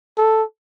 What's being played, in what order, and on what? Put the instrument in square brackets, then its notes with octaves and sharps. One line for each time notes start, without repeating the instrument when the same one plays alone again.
[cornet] A4